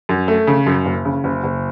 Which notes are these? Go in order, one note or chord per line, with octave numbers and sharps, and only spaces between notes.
F#2
A3
C#3
F#2
F#1
C#3
F#1
F#1